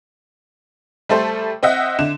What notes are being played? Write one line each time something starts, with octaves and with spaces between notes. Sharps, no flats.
G3 A3 A4 C5
C4 D#5 E5 F#5
D3 E7